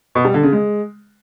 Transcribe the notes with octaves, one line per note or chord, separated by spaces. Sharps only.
B2
G3
D3
C#3
G#3